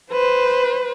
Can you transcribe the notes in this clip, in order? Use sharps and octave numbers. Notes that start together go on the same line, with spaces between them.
B4 C5